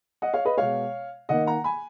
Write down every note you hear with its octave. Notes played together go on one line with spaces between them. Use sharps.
D#5 F#5
C#5 F5
B4 D#5
B2 G#3 B3 C#5 F5
D#3 A#3 D#5 F#5
F#5 A#5
G#5 B5